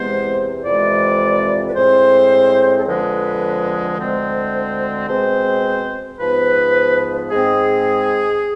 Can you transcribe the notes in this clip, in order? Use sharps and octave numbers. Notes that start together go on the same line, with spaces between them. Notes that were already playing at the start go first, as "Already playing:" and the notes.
Already playing: E2 C3 G#3 B3 C5
F2 C3 E3 G#3 D5
B4
A2 G#3 C4 C5
A4
F2 D3 F3 G#3 B4
B4
D2 D3 G#3 C4 C5
B2 G#3 C4 C5
G#2 F3 B3 B4
G#2 G#3 C4 G#4